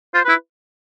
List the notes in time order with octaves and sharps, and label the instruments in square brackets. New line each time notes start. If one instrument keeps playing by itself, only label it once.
[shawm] F4 [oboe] C5
[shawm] E4 [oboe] B4